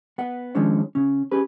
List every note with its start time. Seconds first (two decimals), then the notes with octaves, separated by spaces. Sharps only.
0.18 B3 F#5
0.55 D#3 F3 G#3 C#4 D4 C#5
0.95 C#3 C#4
1.31 C#4 G4 G#4 B4